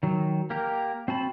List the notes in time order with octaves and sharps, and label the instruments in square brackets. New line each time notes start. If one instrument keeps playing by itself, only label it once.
[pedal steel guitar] D#3 F#3
A#3 G4 A#4
C4 F#4 A5 B5